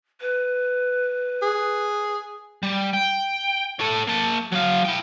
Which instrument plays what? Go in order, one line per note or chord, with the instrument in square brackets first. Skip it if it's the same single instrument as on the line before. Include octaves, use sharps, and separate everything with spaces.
[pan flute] B4
[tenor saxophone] G#4
[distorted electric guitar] G3
G5
A4 C#5
A#3 A5
F#3 F5
E4 G5